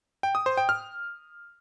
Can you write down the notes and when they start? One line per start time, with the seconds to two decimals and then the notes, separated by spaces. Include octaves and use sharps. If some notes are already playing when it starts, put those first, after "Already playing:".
0.23 G5
0.35 D#6
0.46 C5
0.57 G5
0.69 F6